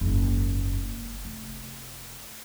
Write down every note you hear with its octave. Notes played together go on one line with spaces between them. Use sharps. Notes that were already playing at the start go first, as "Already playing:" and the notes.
F#1 G#2
F1